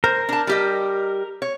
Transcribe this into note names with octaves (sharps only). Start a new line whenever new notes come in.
A#4 C5
D4 A5
G3 G4 D#5
C#5